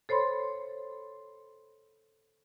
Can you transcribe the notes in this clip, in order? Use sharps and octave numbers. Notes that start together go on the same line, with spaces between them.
A4 C5 C#5 B5 C6